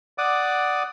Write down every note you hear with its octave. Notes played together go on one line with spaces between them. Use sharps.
D5 F#5 D6 D#6